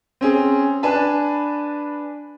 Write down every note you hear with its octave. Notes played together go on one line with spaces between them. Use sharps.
C4 C#4 G#4
D4 B4 G#5 A5 B5